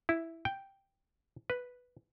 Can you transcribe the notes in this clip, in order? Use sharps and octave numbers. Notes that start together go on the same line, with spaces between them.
E4
G5
B4